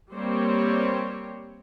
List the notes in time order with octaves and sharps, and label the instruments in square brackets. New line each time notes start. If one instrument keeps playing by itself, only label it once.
[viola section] G3 A#3 C4 G4 C5 C#5